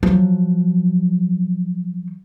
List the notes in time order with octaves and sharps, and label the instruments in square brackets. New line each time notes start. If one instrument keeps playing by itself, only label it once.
[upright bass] F3 F#3